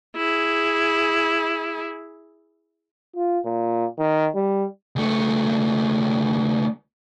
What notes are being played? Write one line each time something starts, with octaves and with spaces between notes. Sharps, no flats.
E4 G#4
F4
A#2
D#3
G3
C#2 A3